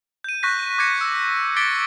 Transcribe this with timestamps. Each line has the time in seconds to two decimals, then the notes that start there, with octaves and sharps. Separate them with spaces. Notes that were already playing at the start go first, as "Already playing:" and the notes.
0.24 G6 D#7
0.43 C#6 F#6 G6 A#6 B6
0.78 D6 G6 G#6 A#6 C#7
1.01 E6
1.56 D6 A6 B6 C#7 D7 G7